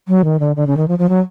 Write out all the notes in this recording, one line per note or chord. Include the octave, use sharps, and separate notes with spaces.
F#3
D#3
D3
D3
C#3
D#3
F3
F3
F#3